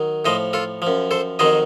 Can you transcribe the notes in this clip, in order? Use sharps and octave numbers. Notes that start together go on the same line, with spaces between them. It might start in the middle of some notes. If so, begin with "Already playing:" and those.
Already playing: D#3 F#3
A2 F3 C5 D#5
F4 A4
F#2 F3
A4 C5
F2 D#3 F#3 C5 D#5